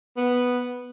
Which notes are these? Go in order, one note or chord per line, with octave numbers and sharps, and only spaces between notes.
B3